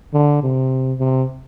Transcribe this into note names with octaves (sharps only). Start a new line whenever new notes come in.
D3
C3
C3